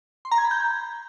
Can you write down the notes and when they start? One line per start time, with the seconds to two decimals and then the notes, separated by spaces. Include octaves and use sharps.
0.25 C6
0.31 A#5
0.38 G#6
0.45 B5
0.51 G6